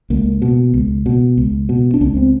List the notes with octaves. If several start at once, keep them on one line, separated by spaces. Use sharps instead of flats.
C#2 A#3
B2
C#2
B2
C#2
B2
D4
C#2 C#4
C4